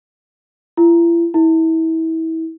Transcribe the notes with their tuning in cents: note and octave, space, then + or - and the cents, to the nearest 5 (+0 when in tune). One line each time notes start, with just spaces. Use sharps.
E4 +40
E4 -30